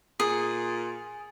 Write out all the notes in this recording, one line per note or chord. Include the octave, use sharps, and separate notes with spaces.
A#2 G#4 D#6